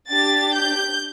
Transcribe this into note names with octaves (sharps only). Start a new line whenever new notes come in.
D4 G4 A6
G6